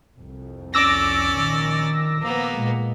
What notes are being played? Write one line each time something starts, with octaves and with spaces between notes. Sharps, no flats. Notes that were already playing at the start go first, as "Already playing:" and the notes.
C2 F2
C#4 D5 D6 E6 A#6
A#1 D#3
F3 A#3 B3
A#2 G#3